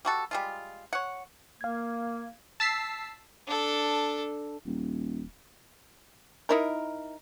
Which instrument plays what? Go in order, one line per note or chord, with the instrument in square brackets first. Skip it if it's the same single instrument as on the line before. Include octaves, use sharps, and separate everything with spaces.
[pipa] G3 F#4 A4
G3 G#3 F4
C#5 F#5
[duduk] A#3 [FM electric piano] F5 G#6
[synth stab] A5 E6 B6 C7
[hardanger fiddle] D4 A4
[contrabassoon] D#1
[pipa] D#4 E4 A#4